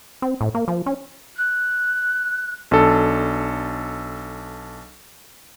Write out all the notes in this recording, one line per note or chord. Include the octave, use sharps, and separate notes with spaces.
C4
A2
A#3
F3
C#4
F#6
B1 D4 A4